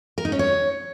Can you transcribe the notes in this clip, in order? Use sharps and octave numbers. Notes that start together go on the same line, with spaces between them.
A#4
D#4
C#4
C#5